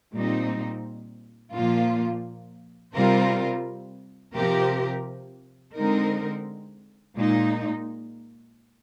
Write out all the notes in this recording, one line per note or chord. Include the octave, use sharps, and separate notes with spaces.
A#2 G3 C4 D#4
A#2 F3 A#3 F4
C3 G3 C4 F4 A#4
C3 F3 C4 G4 A#4
D3 G#3 C4 D#4 A#4
A#2 G#3 D#4